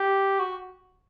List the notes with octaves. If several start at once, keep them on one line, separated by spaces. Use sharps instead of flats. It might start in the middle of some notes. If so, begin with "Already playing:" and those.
Already playing: G4
F#4